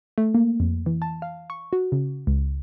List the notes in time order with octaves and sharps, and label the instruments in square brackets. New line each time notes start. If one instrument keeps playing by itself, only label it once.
[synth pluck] A3
A#3
F2
E3
A5
F5
C#6
F#4
C#3
C#2